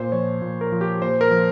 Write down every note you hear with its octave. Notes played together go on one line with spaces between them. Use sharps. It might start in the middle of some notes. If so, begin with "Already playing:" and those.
Already playing: A#2 C5
F3 C#5
A#2
A#4
F3
G4
A#2 C5
A#4
F3